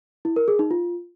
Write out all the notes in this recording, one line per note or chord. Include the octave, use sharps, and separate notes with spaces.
E4
A#4
G#4
D#4
F4